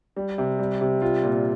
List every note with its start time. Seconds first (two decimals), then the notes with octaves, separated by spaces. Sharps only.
0.17 G3
0.38 C3
0.59 G3
0.81 C3
1.02 G3 F4
1.23 A#2